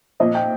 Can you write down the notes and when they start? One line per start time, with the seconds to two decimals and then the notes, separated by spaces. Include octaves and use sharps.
0.20 A#2 F3 C4 D#5
0.35 G5